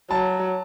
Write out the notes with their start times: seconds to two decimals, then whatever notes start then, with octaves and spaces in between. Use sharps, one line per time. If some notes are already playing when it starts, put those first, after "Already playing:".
0.11 F#3 A5